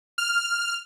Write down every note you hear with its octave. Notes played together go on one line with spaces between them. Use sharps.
F6